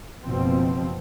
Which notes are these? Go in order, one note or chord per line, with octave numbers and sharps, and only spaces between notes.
F#1 B2 F3 C4